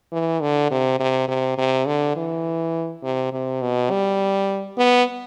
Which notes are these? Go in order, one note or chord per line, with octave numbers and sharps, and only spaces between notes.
E3
D3
C3
C3
C3
C3
D3
E3
C3
C3
B2
G3
B3